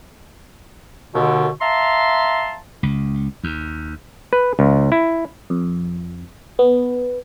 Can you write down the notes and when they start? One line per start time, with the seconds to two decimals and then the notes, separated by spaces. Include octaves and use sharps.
1.14 D#2 B2 D3
1.61 E5 F5 A5 A#5 C6
2.83 C#2
3.44 D#2
4.33 B4
4.59 C#2
4.92 E4
5.50 F2
6.59 B3